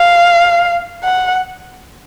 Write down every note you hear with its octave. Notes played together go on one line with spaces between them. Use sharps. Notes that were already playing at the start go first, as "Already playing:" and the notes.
Already playing: F5
F#5